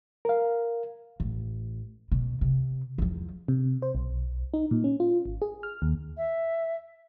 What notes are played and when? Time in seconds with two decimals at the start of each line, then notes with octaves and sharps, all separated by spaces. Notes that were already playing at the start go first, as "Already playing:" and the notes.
0.25 A#4 F5
1.20 A1
2.12 B2
2.41 C3
2.98 E2 F3
3.48 C3
3.82 C5
3.95 B1
4.54 D#4
4.71 A#2
4.84 C#4
5.00 F4
5.26 G#1
5.42 G#4
5.63 F6
5.82 D#2
6.17 E5